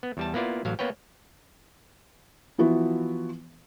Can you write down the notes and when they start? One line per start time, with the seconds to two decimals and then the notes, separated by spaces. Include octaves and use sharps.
0.03 B3
0.17 E2 G3 A5
0.34 A#3 B3 E4 F4 D5
0.65 A1 F#3 F5
0.79 A#3 B3 B4 C#5 G5
2.58 E3 F3 B3 E4 F#4